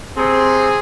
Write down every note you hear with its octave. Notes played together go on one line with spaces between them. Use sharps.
C3 C4 G#4